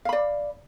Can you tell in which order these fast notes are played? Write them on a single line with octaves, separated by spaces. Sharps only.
F5 B5 D5